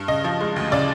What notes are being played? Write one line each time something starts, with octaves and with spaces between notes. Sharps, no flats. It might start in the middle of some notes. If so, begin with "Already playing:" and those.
Already playing: G2
C#3 D#5
F3
G#3
D2
C#3 D5